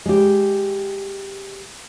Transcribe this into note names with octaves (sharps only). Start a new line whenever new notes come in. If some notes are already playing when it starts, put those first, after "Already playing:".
G#3 G4